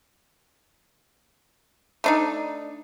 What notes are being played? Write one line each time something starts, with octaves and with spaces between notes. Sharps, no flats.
A3 D4 D#4